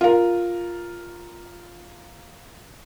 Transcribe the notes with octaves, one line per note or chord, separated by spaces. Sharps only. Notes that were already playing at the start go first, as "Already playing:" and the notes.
F4 A#4